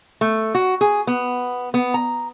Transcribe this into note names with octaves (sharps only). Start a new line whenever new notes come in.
A3
F#4
G#4
B3
B3
A#5